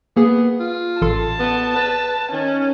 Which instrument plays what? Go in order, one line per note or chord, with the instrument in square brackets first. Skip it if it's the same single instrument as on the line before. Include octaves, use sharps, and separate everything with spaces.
[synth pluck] A#3 G#4 [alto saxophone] B3
[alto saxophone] F4
[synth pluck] A1 A4 C6 [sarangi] A5
[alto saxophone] B3
B4
[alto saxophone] D#3 [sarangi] C#4